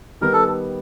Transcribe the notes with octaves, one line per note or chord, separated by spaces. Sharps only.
D#3 G3 B3 A#4
A4